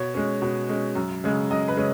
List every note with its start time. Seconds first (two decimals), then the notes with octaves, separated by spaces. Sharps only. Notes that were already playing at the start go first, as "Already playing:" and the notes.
Already playing: B2 C#5
0.14 G#3 C#4
0.42 B2
0.69 G#3 C#4
0.95 F#2
1.24 C#3 G#3 C#4
1.50 F#2 D#5
1.68 B4
1.77 C#3 G#3 C#4